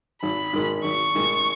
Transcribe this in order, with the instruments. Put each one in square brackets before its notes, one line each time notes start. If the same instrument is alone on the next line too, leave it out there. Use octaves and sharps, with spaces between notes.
[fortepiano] G#1 [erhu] B5
[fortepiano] G#2 D#3 G#3
[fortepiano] G#1 [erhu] C#6
[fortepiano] G#2 D#3 G#3